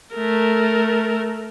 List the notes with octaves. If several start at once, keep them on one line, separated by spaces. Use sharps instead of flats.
A3 A#4